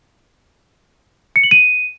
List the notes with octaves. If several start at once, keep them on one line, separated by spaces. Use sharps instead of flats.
C#7
F#7
D#7